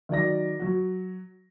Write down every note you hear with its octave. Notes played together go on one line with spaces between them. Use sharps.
D#3 F#3 D5 A#6
F#3 F#4